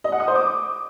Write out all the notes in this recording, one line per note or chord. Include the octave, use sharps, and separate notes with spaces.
D#5
F#5
D#6
C5
D6